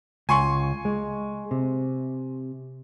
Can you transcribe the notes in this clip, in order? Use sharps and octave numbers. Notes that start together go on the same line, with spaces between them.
C#2 G#5 C6 C#6
G#3
C3